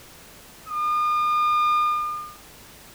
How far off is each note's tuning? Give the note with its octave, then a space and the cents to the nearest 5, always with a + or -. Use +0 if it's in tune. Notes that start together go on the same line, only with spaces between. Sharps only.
D#6 -45